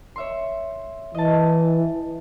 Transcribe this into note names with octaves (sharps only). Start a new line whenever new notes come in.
C#5 E5 C6
E3 D#5 A5